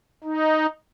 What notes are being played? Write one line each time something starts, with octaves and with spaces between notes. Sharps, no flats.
D#4